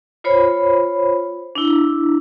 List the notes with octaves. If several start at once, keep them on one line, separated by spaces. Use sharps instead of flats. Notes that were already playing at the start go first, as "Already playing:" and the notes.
F4 C5 C#5 B5
D4 E4